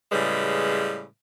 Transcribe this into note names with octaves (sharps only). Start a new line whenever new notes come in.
A2 C#3 G3 G#3 B4